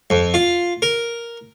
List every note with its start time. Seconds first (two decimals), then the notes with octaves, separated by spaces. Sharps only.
0.10 F2
0.34 F4
0.82 A#4